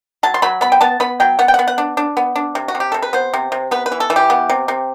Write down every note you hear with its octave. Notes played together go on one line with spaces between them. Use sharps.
F#3 A5
C6
F#3 B5
B3 B5
G5
B3 A5
B3 B5
F#3 G5
B3 F#5
G5
F#5
B3
F#5
D4
D4
B3
D4
C3
F#4
C3
G4
C3 A4
B4
B3 C5
C3
C3
B3 B4
B4
E3
A4
E3
G4
B3
C3
C3